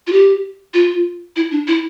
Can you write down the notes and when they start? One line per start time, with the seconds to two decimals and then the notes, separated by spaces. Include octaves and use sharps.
0.07 F4
0.12 G4
0.74 F4
1.36 E4
1.51 D4
1.67 E4